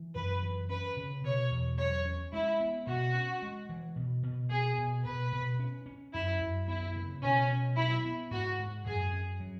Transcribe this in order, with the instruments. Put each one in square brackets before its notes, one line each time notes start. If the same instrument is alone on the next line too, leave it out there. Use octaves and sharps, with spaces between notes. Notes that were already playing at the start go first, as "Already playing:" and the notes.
Already playing: [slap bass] E3
[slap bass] F#2 [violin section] B4
[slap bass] E3
[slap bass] C#4 [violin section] B4
[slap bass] C#3
[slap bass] B2 [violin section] C#5
[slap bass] E2
[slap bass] F#3 [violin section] C#5
[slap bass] C#4
[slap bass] G#3 [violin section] E4
[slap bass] B3
[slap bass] B2 [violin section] F#4
[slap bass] C#4
G#3
E3
B2
B2
[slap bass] B3 [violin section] G#4
[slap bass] B2
[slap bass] B2 [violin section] B4
[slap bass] B2
C#4
C#4
[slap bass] F#2 [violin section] E4
[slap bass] F#2
[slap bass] B3 [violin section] E4
[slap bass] C#3
[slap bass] B2 [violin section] C#4
[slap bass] B2
[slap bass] F#3 [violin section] E4
[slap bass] B3
[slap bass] G#2 [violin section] F#4
[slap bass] G#2
[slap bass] F#2 [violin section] G#4
[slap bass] C#4
F#3